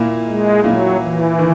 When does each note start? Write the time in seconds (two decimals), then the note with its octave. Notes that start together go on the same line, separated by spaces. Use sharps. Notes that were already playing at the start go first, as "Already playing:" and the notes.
Already playing: A#2 A#3 E4
0.27 G#3
0.63 A#2 F#3 A#3 E4
1.01 E3
1.39 D#3